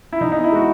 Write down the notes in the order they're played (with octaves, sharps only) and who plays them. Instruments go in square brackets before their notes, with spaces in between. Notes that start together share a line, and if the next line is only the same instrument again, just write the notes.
[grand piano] E4
[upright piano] E3 [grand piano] D#4
[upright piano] B3 [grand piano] D#4
[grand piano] E4
[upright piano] G#3 [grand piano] F#4